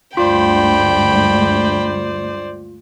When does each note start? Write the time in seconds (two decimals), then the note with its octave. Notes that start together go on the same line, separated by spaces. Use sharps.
0.17 D2 G2 G#3 F4 C5 D5 G5 B5